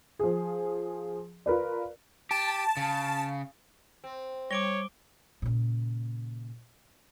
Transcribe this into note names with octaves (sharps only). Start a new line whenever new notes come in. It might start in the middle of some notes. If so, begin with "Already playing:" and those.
F3 G#4
F4 A#4 B4 D5
G4 A5
C#3
C4
G3 C#5 D6 D7 G7
A#2 C#3